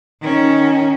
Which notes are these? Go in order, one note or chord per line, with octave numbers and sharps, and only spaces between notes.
D#3 C#4